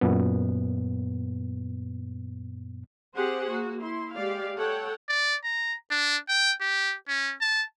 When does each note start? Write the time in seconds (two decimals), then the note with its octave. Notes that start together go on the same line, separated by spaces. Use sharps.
0.01 F#2 A#2 B3
3.16 C4 G4 G#4 C5 F#5
3.49 A#3 F#4
3.81 E4 C6
4.14 G#3 G4 D5 F5
4.57 A4 C#5 F#5 G5
5.09 D5
5.44 A#5
5.91 D4
6.28 G5
6.61 G4
7.08 C#4
7.41 A5